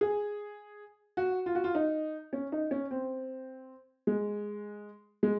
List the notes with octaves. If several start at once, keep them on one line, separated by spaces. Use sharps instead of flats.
G#4
F#4
F4
F#4
F4
D#4
C#4
D#4
C#4
C4
G#3
G#3